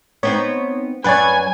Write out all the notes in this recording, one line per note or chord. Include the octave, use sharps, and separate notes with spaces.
B3 C4 D#4 C#5
F#2 F#3 B4 C#5 D5 G#5